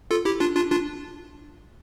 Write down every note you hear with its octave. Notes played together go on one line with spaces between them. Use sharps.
F4 A4
E4 G4
D4 F4
D4 F4
D4 F4